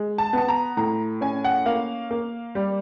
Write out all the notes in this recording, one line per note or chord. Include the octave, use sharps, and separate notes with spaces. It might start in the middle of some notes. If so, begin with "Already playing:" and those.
Already playing: G#3
A5
B3 A5
A#5
A2 A#5
C#4 G#5
F#5
A#3 F5
A#3
G3